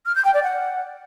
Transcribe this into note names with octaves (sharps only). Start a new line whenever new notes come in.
F6
G6
G5
D5
F#5